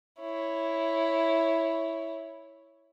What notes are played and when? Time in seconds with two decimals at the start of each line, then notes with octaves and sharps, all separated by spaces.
0.20 E4 C#5